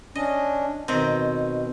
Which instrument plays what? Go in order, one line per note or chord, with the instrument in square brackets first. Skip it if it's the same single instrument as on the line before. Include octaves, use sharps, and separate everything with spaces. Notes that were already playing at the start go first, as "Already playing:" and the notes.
[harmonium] C#4 D4 [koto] D#5
[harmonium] B2 [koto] D#3 C4